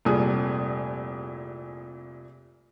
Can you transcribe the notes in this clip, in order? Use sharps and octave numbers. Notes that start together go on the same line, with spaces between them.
F1 C2 A#2 G#4